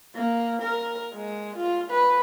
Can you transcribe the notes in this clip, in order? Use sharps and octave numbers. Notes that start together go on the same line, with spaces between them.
A#3
A#4
G#3
F4
B4